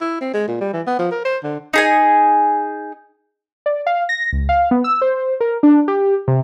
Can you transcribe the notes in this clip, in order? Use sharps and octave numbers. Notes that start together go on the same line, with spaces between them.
E4
C4
G#3
A#2
G3
E3
B3
F3
A#4
C5
D3
D#4 G#4 G#5
D5
F5
A#6
C#2
F5
B3
E6
C5
A#4
D4
G4
C3